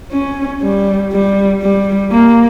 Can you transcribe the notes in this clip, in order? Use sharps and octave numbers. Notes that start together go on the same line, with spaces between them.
C#4
G3
G3
G3
A#3